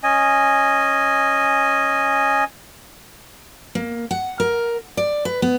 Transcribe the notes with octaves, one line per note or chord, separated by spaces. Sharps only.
C#4 D#5 G#5
A#3
F#5
A#4
D5
B4
B3